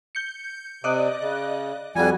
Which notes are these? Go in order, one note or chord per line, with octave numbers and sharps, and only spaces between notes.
G6 C#7
C3 D5 D#5 F#6
C#3
F2 F3 G3 F#4 G#5